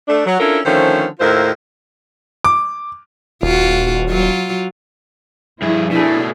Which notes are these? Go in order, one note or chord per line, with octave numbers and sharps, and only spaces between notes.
A3 D4
F#3
C#4 D4 E4 F4 A4 A#4
D3 D#3 F3 A3 C#4 C5
D#2 A2 E4 F4 A#4 C5
D6
D#1 F4 F#4
F#3 F4
G2 F3 E4 G#4
B2 A3 D4 E4 G#4